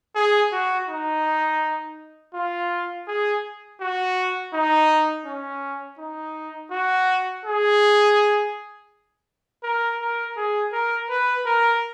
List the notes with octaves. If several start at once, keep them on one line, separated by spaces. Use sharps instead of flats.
G#4
F#4
D#4
F4
G#4
F#4
D#4
C#4
D#4
F#4
G#4
A#4
A#4
G#4
A#4
B4
A#4